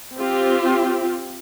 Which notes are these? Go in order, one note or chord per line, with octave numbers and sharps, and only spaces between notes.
C4 F4 G4